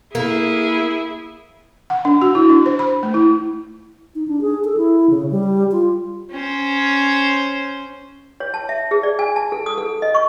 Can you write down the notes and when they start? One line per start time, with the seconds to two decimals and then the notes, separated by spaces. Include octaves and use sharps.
0.15 A#3 E4 G#4
1.90 F#5
2.05 D4
2.22 F#4
2.35 E4
2.49 D4
2.66 C5
2.79 B5
3.03 A3
3.14 E4
4.15 D#4
4.28 D4
4.41 G#4
4.64 A4
4.77 E4
5.10 C#3
5.31 G3
5.72 F4
6.31 C#4 C5
8.40 C#5
8.54 A5
8.69 E5
8.91 G#4
9.03 D5
9.19 G#5
9.36 A5
9.52 A4
9.66 D#6
9.78 A4
10.02 D#5
10.15 C#6